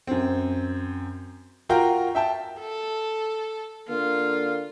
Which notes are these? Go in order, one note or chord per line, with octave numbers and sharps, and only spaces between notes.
F#2 C4
F4 F#4 A#4 F5 G5 A#5
E5 G5 A5
A4
D3 A#3 F4